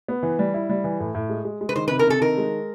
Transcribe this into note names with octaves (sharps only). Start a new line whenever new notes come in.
B3
E3
G3
E4
G3
E3
A2
A2
G#3
G#3
G#3
B4
D#3 C5
B4
C3
A#4
C3 A4
D#3 A#4
G#3